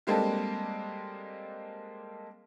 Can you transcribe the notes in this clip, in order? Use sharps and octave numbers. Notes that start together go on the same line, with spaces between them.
G3 G#3 A#3 C4 D4 A4